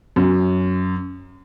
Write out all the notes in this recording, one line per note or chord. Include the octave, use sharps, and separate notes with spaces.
F#2